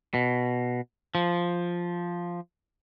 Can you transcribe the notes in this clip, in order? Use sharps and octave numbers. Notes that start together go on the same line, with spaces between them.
B2
F3